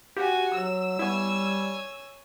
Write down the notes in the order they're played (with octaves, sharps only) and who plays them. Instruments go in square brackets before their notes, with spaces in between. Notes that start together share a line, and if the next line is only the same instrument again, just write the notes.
[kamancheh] F#4 G#5 [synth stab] G4
[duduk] F#3 [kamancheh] E6
[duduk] G3 [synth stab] B3 E4 [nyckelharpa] C#5 G#5